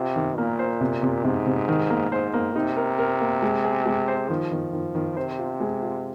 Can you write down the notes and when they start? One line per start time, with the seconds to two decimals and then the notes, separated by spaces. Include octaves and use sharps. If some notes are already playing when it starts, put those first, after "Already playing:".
Already playing: C3 F4
0.16 D#3
0.37 A#2 A#3
0.59 C5
0.81 C3
1.03 C3
1.24 G#2 C3
1.46 C3
1.68 D#3
1.90 A#3
2.11 G#2 C5
2.34 A#3
2.55 C3 D#4
2.77 A#4
2.98 A#4
3.20 A#3
3.42 G#3
3.64 G#4
3.86 G#3
4.08 C5
4.29 D#3 F3
4.52 D#3
4.73 D#3
4.95 D#3
5.17 C3 C5
5.39 F4
5.60 G#3
5.82 F4